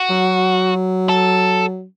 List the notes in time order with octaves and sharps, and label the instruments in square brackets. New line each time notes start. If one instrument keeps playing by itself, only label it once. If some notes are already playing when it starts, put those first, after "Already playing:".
Already playing: [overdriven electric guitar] F#4
[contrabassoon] F#3
[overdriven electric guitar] A4